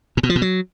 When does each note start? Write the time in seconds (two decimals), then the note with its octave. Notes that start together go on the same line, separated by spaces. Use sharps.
0.17 A#2
0.23 B2
0.29 F3
0.36 B2
0.42 F#3